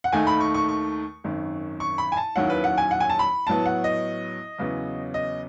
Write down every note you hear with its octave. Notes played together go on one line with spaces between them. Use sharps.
F#5
D#2 D#3 A3 D#4 G#5
B5
C#6
C#6
C#6
G#1 F#2 D#3
C#6
B5
G#5
A5
D#2 D#3 F#3 C#4 E4 F#5
B4
F#5
G#5
F#5
G#5
A5
B5
A2 F#3 B3 A5
F#5
D#5
E2 C#3 F#3 B3
D#5